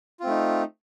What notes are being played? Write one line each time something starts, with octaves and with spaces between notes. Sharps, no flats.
A3 C4 D#4 F4